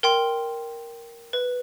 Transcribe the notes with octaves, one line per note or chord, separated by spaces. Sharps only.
A#4 G5 C6
B4